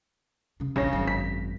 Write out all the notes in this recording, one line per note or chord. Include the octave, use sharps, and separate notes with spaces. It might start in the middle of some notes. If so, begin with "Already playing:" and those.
C#3 C#4
E1 A#1 C#3 C#5 A#6
G#1 F#2
B6